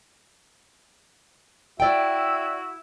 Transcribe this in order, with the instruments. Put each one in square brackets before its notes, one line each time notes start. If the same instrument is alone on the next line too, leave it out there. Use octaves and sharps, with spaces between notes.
[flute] E4 [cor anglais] F#4 [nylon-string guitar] D5 G5 [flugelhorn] E5